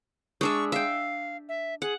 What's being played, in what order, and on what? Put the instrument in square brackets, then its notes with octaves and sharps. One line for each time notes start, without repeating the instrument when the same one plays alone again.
[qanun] G#3 D4 E5 [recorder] C#6
[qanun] E5 G5 [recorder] F5
[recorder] E5
[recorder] G#4 [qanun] F#5